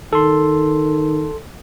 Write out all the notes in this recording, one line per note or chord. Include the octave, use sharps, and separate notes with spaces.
D#3 A4 C6